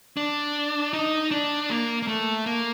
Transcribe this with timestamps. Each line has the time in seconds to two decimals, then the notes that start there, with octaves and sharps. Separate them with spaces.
0.17 D4
0.93 D#4
1.31 D4
1.70 A#3
2.02 A#3
2.07 A3
2.46 A#3